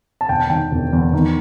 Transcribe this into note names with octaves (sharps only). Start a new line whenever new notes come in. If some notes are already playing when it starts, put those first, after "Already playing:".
A5
E1 G5
A5
D#3 G5
E1
E2
D#3